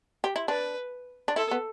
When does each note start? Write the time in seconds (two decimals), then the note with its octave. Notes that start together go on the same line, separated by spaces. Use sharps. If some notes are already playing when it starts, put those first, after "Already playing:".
0.24 G4
0.36 E4
0.48 D4 B4
1.28 D4
1.36 E4 A4
1.51 B3